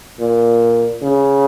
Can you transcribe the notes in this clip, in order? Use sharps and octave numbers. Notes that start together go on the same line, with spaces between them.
A#2
C#3